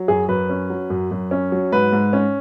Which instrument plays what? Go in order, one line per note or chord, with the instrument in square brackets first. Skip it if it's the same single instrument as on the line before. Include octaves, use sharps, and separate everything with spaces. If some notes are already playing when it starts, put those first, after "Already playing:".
Already playing: [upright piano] F#3
F#2 G#4
F#2 B4
C#4
F#3
F#2
F#2
C#4
F#3
G#2 B4
G#2
C#4